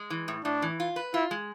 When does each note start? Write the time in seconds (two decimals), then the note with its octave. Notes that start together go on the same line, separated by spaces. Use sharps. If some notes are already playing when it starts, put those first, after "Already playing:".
Already playing: G#3
0.10 E3
0.28 A2
0.44 A2 D4
0.62 E3
0.80 F4
0.96 B4
1.14 E4 F4
1.31 G#3